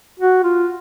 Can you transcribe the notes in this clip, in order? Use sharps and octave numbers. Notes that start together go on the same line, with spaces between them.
F#4
F4